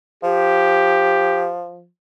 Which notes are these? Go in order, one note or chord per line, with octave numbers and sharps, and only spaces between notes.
F3 G4